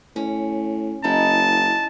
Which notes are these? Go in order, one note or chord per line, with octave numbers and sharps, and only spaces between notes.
A2 C#4
F#1 C#4 D#4 E4 A5